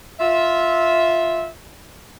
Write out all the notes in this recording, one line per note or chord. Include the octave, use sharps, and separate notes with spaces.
F4 E5